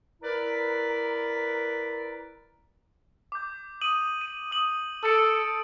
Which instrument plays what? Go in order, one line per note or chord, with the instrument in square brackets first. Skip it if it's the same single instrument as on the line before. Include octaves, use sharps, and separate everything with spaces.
[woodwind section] E4 A#4 B4 D5 A#5
[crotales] D6 G6
D#6 D#7 F#7
D#7
D#6 F#7
[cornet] A4 [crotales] E6 C#7 D7